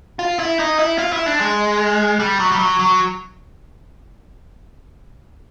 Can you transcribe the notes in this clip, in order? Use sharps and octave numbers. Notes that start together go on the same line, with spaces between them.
F4
E4
D#4
E4
F4
E4
D4
G#3
G3
F#3
G3
F#3
F#3